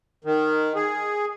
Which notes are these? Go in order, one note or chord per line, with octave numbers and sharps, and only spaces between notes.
D#3
G#4